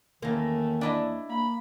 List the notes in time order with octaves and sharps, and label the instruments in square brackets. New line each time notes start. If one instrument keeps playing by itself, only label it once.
[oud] E2 A#3 [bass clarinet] D#3 [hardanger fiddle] A3 C#4
[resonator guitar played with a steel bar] D4 E4 D#5
[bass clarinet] A#3 [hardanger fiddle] B5